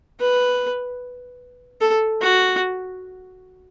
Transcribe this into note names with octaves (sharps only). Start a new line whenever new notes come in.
B4
A4
F#4